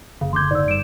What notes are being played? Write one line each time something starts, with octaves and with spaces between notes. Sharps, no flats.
F#1 C#3
D2 C6 D6 G6 G#6
G#2 D5 E6
G2 D7 E7